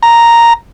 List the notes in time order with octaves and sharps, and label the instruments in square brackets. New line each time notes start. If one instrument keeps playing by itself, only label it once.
[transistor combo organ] A#5